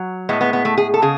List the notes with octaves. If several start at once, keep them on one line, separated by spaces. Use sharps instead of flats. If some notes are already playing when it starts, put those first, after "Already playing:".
Already playing: F#3
A2 G#3 B3
B3
B3
A3
G#4
A4
C#3 G#4